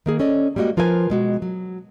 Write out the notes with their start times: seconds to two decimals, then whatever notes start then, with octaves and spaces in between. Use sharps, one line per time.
0.06 D#3 A#3 G#4
0.20 C#4 A4 D5 D#5
0.56 G3 G#3 A#3 F#4 D#5
0.77 F3 F4 A#4 B4 E5 G#5
1.10 B2 G#3 F#4
1.42 F#3